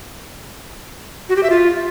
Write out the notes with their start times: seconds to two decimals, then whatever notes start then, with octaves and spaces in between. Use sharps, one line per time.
1.29 F#4
1.36 G4
1.43 E5
1.50 F4